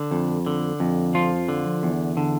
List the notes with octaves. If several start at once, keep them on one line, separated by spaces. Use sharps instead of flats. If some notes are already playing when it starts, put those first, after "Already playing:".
Already playing: D3
F2
D3
F2
F3 F4
D3
E2
D3